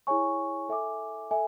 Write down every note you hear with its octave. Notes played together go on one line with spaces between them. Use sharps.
E4 G#4 C#5 G#5 C#6
A4 E5 G#5 D6
A4 E5 G#5